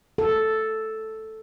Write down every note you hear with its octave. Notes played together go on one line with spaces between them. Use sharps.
A4